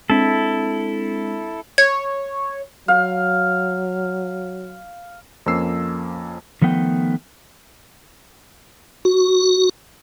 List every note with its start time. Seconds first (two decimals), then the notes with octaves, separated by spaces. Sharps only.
0.10 G#3 C4 D4 E4 A4
1.78 C#5 G#6
2.88 F#3 F5
5.46 F2 F3 A#3 C#4 E6 C7
6.62 D#3 F3 A3 B3 G5
9.05 F#4